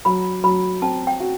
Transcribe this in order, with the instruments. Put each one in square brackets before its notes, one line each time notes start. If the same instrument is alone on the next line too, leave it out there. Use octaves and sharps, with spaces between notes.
[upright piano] F#3 [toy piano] B5
[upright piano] F#3 [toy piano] B5
[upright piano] C4 [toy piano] A5
[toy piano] G5
[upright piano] F#4